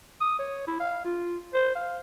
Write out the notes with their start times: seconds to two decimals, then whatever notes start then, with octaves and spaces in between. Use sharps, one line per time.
0.21 D#6
0.39 C#5
0.68 E4
0.80 F5
1.05 F4
1.54 C5
1.75 F5